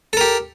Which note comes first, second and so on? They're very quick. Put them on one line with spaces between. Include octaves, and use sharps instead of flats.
A4 A#4 G4